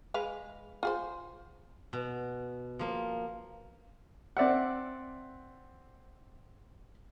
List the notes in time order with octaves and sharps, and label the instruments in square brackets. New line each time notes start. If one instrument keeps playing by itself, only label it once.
[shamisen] G#3 B4 F5
F4 G#4 C5
[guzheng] B2
F3 A#3
[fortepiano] C4 D5 E5 F#5